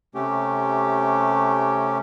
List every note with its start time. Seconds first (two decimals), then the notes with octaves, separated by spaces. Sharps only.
0.15 C3 A3 C#4 G4